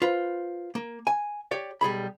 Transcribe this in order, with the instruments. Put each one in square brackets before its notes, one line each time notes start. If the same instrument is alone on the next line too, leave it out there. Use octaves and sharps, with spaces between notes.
[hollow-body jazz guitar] F4 B4 C5
A#3
G#5
G4 C#5 D5
B1 G3 G#4 B5